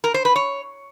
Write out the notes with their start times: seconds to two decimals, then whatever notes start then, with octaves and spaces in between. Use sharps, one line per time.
0.04 A#4
0.14 C5
0.25 B4
0.36 C#5